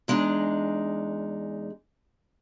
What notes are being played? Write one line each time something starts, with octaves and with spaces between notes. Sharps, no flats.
E2 G#3 D4 D#4